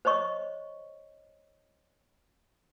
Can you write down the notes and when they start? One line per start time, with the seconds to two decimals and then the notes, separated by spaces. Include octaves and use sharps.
0.05 C5 C#5 D#5 C#6